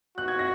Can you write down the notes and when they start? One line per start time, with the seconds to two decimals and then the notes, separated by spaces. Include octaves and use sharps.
0.18 F#4 F#6
0.28 G#6
0.39 A#6